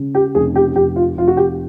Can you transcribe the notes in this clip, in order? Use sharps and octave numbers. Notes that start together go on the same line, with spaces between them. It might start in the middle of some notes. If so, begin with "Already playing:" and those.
Already playing: C#3
G4
F1 G#4
G4
F1 G4
F4
F1 F4
F#4
G4